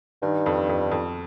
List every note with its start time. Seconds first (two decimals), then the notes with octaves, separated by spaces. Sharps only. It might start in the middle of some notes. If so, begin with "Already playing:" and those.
0.22 G2 D#3
0.46 F2
0.69 F2
0.91 F2